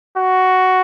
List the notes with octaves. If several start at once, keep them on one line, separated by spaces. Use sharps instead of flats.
F#4